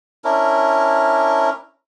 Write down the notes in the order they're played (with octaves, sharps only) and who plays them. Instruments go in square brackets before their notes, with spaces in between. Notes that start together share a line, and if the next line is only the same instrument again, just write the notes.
[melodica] C#4 D4 E4 A#4